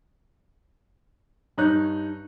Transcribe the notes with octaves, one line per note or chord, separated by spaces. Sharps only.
G2 D#4 C#5 F#6 G6